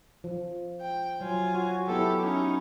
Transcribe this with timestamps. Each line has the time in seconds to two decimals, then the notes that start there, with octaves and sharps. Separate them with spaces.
0.24 F3
0.82 G5
1.21 F#3 F4 G#5
1.54 F#4
1.87 F#3 B3 E4 G4 A4
2.22 C#4 D#4